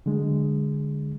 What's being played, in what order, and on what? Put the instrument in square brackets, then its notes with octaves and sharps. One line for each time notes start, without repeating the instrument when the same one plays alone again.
[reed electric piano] D3 F#3 G#3